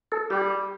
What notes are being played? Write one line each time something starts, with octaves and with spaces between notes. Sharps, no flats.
A4
G3 G4